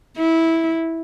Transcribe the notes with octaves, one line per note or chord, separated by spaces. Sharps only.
E4